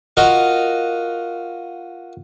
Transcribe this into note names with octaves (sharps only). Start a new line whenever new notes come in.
F4 F#4 A#4 D#5